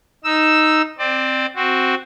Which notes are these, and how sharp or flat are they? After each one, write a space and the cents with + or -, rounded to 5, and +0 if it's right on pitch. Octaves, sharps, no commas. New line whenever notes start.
D#4 +0 E6 +0
C4 +0 D5 +25
C4 +0 F#4 +0